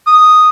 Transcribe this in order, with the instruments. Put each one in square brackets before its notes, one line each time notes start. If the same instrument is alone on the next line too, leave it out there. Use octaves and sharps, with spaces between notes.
[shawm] D#6